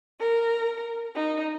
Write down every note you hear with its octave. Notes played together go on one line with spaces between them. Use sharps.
A#4
D#4